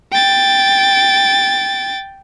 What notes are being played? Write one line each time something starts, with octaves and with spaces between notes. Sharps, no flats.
G5 A6